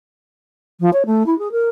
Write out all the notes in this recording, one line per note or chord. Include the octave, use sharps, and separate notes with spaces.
F3
C#5
A3
E4
G#4
A#4